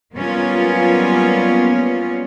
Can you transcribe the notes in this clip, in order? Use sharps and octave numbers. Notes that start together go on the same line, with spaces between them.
F#3 G3 A#3 B3 C#4 F4